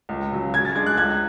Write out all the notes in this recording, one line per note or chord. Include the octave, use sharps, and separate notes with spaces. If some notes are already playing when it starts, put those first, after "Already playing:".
C#2
C#3 F#3
C#3 G#6
A6
G#3 D4 G#6
F#6
C#2 G#6